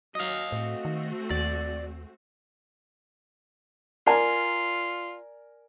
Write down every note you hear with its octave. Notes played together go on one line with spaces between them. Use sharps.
F#3 D#5 F5
A2 A3 C4 F#4
D#3
D#2 D5
F4 A#4 D5 G#5